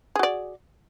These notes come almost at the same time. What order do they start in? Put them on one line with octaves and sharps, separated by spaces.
G#4 F#4 D5